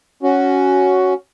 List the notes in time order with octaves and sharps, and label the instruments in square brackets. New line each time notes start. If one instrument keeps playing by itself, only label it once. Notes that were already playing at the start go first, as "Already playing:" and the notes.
[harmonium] C#4 F#4